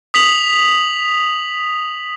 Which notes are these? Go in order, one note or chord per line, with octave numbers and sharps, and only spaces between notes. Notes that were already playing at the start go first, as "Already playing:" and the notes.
D#6 B6 F7 F#7